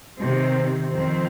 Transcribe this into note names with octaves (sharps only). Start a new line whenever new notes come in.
C3 D#3 C4
F2 D#3 C4